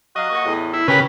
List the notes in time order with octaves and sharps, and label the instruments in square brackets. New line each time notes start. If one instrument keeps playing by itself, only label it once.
[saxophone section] F#3 F#4 F5 [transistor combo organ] D#5
[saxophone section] A#3 F#4
E2 A2
[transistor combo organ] E4
[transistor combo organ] C#3 B4 [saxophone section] G4 A#4